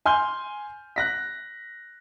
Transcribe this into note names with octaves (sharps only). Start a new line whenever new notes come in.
G#5 C6 F6 G6 G7
F#6 A#6 B6